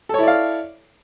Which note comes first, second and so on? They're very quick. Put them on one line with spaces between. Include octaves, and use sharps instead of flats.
A4 C#5 E4 D5 F5